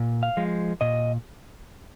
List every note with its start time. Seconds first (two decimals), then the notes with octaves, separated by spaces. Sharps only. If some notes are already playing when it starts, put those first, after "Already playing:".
Already playing: A#2
0.23 F5
0.37 F3 G#3
0.81 A#2 D#5